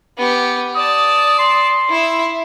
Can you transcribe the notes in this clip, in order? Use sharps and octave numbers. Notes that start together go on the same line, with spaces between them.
B3 G4
D5 A5 D#6
C6
E4 E5